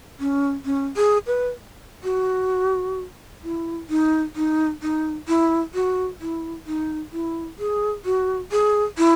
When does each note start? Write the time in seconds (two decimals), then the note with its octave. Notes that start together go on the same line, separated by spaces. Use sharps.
0.20 C#4
0.65 C#4
0.96 G#4
1.27 B4
2.04 F#4
3.44 E4
3.90 D#4
4.36 D#4
4.82 D#4
5.28 E4
5.74 F#4
6.21 E4
6.67 D#4
7.12 E4
7.59 G#4
8.05 F#4
8.52 G#4
8.98 E4